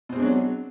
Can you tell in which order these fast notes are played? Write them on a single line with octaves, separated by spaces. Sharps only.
B2 C4 G#3 D4 F#3